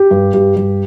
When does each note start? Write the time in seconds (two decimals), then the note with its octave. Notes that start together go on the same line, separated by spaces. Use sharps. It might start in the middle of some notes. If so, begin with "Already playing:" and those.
Already playing: G4
0.11 G2
0.34 G2
0.56 G2